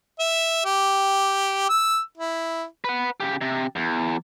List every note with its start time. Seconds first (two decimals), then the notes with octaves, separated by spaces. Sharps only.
0.19 E5
0.65 G4
1.70 E6
2.17 E4
2.84 B4 F#5
3.20 C#3 G4
3.41 C3
3.76 E2